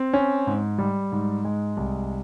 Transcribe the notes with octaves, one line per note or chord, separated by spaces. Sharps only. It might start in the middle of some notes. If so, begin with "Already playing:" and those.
Already playing: C4
C#4
G#2
G3
G#2
G#3
C2